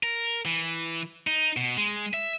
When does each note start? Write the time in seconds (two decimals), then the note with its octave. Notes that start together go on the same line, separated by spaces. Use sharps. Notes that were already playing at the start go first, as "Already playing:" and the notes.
0.03 A#4
0.45 E3
1.27 D#4
1.56 B2
1.77 G#3
2.14 E5